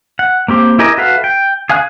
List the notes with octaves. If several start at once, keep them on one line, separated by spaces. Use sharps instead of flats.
F#5
A#3 C4 G4
E4 G4 G#4 A#4 D#5
F#4 A4 B4 E5 F5
G5
G#4 F5 G#5 F#6